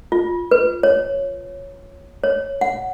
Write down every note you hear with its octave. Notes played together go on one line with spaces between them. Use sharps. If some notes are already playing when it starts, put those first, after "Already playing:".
F4
B4
C#5
C#5
F#5